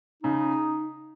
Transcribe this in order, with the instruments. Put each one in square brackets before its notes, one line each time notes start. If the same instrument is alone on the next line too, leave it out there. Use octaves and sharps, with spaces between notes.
[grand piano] C#3 [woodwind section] D#4